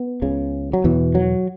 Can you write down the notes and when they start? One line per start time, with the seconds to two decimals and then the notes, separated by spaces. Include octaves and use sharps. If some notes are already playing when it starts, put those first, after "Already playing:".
Already playing: B3
0.22 C#2 C#3
0.73 F#3
0.84 E2 B2 E3
1.15 F#3